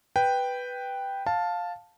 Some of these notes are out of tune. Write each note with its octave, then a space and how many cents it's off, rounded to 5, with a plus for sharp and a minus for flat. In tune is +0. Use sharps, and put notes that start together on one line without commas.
B4 +0 G5 +0
F5 +10 A5 +0